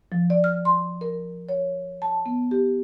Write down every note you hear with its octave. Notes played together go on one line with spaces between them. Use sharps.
F3
D5
F6
C6
A#4
C#5
A5
B3
G4